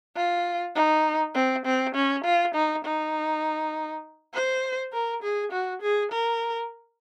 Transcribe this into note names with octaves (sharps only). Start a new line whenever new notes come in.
F4
D#4
C4
C4
C#4
F4
D#4
D#4
C5
A#4
G#4
F#4
G#4
A#4